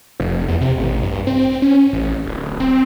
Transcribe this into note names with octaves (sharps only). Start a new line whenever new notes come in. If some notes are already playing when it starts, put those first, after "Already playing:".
F1
E2
C3
A1
G2
C4
C#4
A1
D1
C4